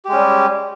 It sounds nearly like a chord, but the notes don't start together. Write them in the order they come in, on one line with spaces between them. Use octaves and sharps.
G4 G#3 C#4 G3